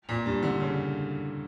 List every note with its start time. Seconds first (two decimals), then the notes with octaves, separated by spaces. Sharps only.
0.09 A#2
0.26 G2
0.43 D3
0.60 C#3